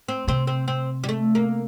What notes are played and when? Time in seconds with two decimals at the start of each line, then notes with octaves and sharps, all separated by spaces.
0.08 C4
0.27 C3 C4
0.47 C4
0.68 C4
1.04 G3
1.09 A3
1.35 A#3